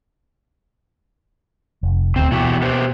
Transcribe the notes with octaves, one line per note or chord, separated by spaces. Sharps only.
F1
D#1 D2 C4
B2 E3 F#4 G4
G4 B4 C5